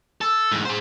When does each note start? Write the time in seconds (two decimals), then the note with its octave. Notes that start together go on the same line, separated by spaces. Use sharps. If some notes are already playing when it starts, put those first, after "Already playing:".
0.21 A4
0.52 G#2 E3
0.65 G#4 C5